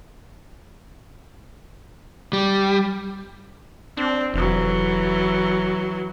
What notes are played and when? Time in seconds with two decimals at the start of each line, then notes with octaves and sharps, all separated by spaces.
2.33 G3
3.97 C4 D4
4.34 F1 E3 F#3